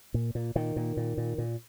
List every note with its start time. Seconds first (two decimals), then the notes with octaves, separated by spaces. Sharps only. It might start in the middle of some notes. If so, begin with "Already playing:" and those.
0.14 A#2
0.35 A#2
0.55 A#2 D#3
0.76 A#2
0.97 A#2
1.18 A#2
1.38 A#2